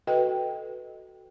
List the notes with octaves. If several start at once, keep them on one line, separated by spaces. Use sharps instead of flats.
F#4 A4 B4 D#5 G5